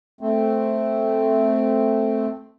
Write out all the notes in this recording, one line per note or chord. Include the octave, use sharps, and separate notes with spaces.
A3 C4